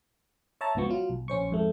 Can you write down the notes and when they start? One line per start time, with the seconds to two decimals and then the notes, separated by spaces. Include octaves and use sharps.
0.61 C#5 E5 A5 A#5
0.75 G#1 C#2 B2 F3 B3 C#6
0.90 F#3 F4
1.10 B1
1.28 A#1 C#4 C5 C#6
1.51 F2 G#2 A3